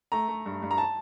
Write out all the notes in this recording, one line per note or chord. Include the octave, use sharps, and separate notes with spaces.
A3 A#5
A3
G2
G2
A#5
A5